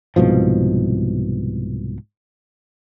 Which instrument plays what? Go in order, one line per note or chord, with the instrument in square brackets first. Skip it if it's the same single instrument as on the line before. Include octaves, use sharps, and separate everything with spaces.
[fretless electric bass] C2 G#2 B2 F3